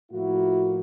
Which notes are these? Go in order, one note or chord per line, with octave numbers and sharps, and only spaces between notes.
A2 F3 A#3 E4 F#4